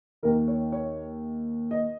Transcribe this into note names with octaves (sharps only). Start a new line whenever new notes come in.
D#2 D#3 A#4
C#5
C#5
D#5